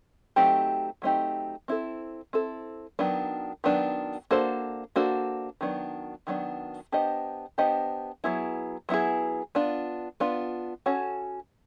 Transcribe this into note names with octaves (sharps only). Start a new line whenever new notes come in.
F#3 A3 C4 D#4 G4
F#3 A3 C4 D#4 G4
C4 E4 A4
C4 E4 A4
D#3 F#3 B3 D4
D#3 F#3 B3 D4
A#3 D4 F#4 A4 C5
A#3 D4 F#4 A4 C5
D#3 F#3 B3 D4
D#3 F#3 B3 D4
B3 D4 G4 C5 D#5
B3 D4 G4 C5 D#5
F#3 B3 E4 G#4
F#3 B3 E4 G#4
B3 D4 F4
B3 D4 F4
C#4 F#4 A4 C#5